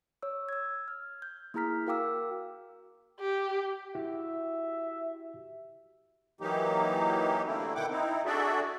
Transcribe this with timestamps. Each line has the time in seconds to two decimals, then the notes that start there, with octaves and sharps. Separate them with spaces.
0.22 C#5 E6
0.49 E6 G#6
0.88 F6
1.22 G6
1.54 A#3 E4 G#4 A#5 F6 B6
1.87 F#4 A#4 F5 G5 D6 E6
3.20 G4
3.95 E4 F#4 G4 E5
6.41 E3 F#3 A#3 D#4 G4
7.46 D3 A3 A#3 C4 E4
7.75 B2 D#3 E4 F#5 G5 D6
7.90 C4 D#4 E4
8.26 D4 F#4 G#4 A4 D5 E5